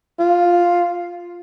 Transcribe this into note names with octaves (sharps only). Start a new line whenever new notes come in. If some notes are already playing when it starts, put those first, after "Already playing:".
F4